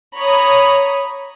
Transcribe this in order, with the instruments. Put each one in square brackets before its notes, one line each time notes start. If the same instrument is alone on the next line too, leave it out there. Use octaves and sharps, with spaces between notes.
[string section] C#5 A#5 B5 D#6